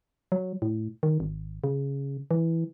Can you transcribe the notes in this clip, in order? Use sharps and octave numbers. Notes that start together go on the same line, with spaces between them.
F#3
A2
D#3
G#1
C#3
E3